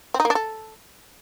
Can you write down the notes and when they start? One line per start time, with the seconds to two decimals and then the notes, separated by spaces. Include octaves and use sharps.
0.14 C4
0.20 D#4
0.25 A#3
0.30 D4
0.35 A4